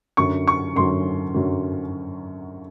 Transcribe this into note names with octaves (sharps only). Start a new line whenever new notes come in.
F#2 D3 F#3 C#6
C#6
F#2 D3 F#3 C6
F#2 D3 F#3